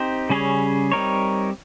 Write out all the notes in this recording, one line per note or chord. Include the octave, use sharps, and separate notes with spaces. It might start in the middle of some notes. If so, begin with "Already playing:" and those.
Already playing: C4 D#4 G4 C5
C#3 G3 C#4 G#4 C#5
G3 C4 D#4 A#4 C#5